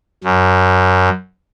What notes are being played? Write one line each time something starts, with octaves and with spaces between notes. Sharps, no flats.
F#2